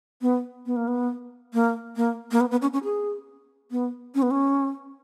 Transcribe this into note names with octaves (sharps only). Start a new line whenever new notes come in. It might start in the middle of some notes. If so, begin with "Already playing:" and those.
B3
B3
A#3
B3
A#3
A#3
A#3
B3
B3
C#4
C#4
G#4
B3
C#4
B3
C#4